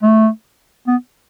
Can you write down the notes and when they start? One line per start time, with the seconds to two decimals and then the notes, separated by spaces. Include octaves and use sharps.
0.03 A3
0.87 B3